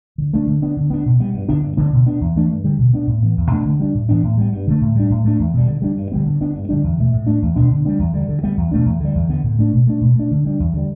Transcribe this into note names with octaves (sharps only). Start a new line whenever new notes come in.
D3
A3 D4
D3
B3 D4
D3
B3 D4
B2
G3 B3
G2
D3 B3 D4
G2
D3 B3 D4
B2
B3 D4
E2
E3 A3 D4
G2
D3 G3
B2
B3 D4
A2
E3 B3
E2
B2 A3 D4
D3
G3 D4
A2
E3 B3 D4
A2
G3 B3
G2
D3 A3
A2
G3 D4
A2
A3 D4
E2
B2 G3
D3
G3 D4
G2
D3 G3 B3
D3
B3 D4
G2
D3 G3 D4
E2
B2 A3
A2
A3 D4
E2
B2 B3 D4
D3
G3 B3 D4
E2
D3 G3
D3
G3 B3
E2
B2 A3 D4
E2
D3 G3
E2
D3 B3
A2
A3 D4
B2
A3 D4
B2
A3 D4
D3
G3 D4
E2
D3 G3